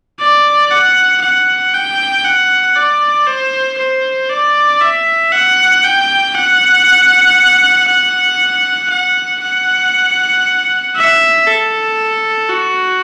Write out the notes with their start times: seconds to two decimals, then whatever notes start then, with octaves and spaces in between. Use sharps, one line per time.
0.20 D5
0.71 F#5
1.22 F#5
1.74 G5
2.25 F#5
2.76 D5
3.27 C5
3.78 C5
4.30 D5
4.81 E5
5.32 F#5
5.84 G5
6.34 F#5
7.89 F#5
8.91 F#5
9.42 F#5
10.96 E5
11.47 A4
12.50 F#4